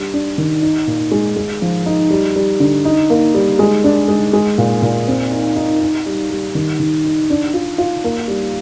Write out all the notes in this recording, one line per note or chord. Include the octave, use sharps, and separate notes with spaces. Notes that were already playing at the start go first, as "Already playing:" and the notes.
Already playing: G3 D4
D4
D#3
D#4
A#2
G#3
G#3
F3
D#4
G3
G3
D3
D#4
A#3
G3
G#3
D4
G#3
G#3
A#2
A#2
C4
D#4
D#4
D#4
G3
G3
D#3
D#3
D#4
D4
F4
F4
A#3
G3